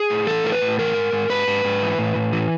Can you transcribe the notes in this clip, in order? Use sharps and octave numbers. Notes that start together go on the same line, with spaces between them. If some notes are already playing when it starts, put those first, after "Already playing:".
Already playing: G#4
A2
E3 A4
A2 A#4
B4
A2
E3 A#4
G#2
G#2
G#2 B4
G#2
G#2
E3
A2
A2
E3